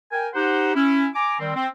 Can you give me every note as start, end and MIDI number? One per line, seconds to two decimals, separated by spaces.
0.12 0.29 70
0.12 0.29 79
0.12 0.29 80
0.35 0.75 63
0.35 0.75 67
0.35 0.75 72
0.35 0.75 78
0.75 1.08 61
0.75 1.08 64
1.15 1.38 80
1.15 1.38 82
1.15 1.38 86
1.39 1.52 51
1.39 1.52 55
1.39 1.52 60
1.56 1.67 60